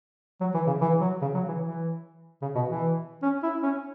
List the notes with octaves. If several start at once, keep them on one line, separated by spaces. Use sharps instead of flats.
F#3
E3
C#3
E3
F#3
C#3
F#3
E3
E3
C#3
B2
E3
C#4
E4
C#4